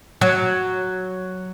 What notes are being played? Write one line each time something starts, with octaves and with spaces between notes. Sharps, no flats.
F#3